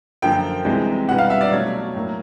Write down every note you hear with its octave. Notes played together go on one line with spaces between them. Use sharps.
F#2 D3 F3 A#3 G5
C2 C3 E3 G#3
C2 B2 G3 B3 F#5
F5
E5
D5
B2 F#3 A3 C#5
A2 F#3 A#3